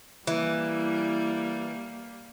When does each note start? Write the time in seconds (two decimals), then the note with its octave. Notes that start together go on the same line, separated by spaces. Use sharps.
0.27 E3 G3 A#3